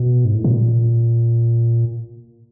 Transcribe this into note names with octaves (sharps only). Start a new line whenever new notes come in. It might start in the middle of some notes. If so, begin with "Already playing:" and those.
Already playing: B2
G#2
A2
A#2